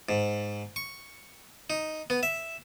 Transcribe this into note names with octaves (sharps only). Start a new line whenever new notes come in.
G#2
C#6
D#4
B3
E5